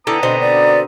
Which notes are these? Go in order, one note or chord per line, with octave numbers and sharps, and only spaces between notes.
D3 B3 E4 A4 G5 A#5 D#6
B2 D3 C4 D#5
D5